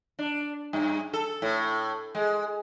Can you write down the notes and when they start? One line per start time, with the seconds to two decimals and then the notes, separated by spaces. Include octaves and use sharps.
0.19 D4
0.73 G2
1.13 A4
1.42 A2
2.15 G#3